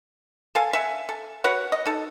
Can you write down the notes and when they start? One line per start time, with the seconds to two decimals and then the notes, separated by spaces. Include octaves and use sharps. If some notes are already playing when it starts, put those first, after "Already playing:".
0.55 A4 F5 G#5
0.73 E5 F#5 G#5
1.09 A4
1.44 F#4 B4 C#5 F#5
1.72 D#5
1.86 D#4 A4